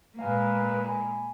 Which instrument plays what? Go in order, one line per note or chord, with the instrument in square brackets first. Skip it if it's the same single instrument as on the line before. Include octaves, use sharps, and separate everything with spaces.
[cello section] A#2 G#3 A#3 [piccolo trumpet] B4 [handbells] F5 G#5 F6
[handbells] G#5 B5